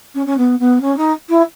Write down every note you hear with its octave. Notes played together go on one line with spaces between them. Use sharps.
C#4
C#4
B3
B3
C#4
D#4
E4